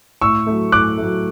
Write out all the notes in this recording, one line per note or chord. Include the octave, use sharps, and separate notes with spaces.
A2 C#6 E6
F#3 A3
A2 D6 F#6
A3
F#3